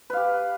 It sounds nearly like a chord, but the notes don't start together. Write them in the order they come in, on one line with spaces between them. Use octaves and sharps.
B4 F5 G4